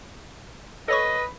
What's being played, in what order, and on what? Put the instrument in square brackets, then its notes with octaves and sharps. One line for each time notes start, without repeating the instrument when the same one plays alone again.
[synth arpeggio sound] A4 C#5 C#6 [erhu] B4 [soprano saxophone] D#5